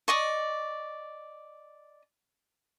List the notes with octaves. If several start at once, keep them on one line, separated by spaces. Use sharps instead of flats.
D5 D#5 C#6